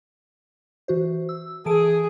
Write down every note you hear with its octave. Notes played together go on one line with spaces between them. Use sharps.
E3 F#4 C5
E6
E3 G#4 A5 D7